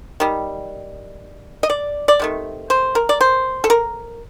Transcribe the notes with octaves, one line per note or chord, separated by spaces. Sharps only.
D#3 G3
D#5
D5
D5
C3 D#3 A3
C5
A#4
D5
C5
A4
A#4